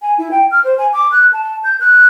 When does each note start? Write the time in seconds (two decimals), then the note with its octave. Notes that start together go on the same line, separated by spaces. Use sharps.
0.02 G#5
0.18 E4
0.31 G5
0.51 F6
0.64 C5
0.78 G#5
0.93 D6
1.12 F#6
1.33 A5
1.64 G6
1.80 F#6